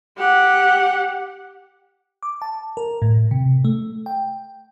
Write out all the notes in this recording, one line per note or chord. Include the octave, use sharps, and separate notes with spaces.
G4 F#5
D6
A5
A#4
A2
C3
A3
G5